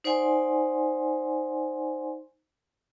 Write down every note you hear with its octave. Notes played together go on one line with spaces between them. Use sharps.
D#4 C5 D5 F#5 G#5 C6